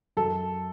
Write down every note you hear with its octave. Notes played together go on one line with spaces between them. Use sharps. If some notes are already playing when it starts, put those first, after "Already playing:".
F#2 A4